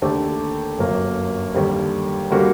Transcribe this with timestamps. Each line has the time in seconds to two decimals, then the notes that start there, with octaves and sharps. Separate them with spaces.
0.02 D#2 D3 A3 D4 G4
0.79 G1 F#2 F#3 A#3
1.54 D#2 D3 G3
2.30 D3 G3 A#3 F#4